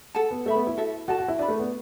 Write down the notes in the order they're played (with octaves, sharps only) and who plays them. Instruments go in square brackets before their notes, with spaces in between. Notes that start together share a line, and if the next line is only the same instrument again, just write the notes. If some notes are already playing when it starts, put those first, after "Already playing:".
[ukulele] A4 F#5 A5
[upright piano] B3
[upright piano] A3 [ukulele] A4 E5 B5
[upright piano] B3
E4
[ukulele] F#4 A4 E5
[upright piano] F#4 [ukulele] A4 D5 A5
[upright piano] F#4
E4
[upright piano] D4 [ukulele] B4 D5 B5
[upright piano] A3
B3